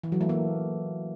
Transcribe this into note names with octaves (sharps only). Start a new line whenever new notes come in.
E3
F#3
A3
A#3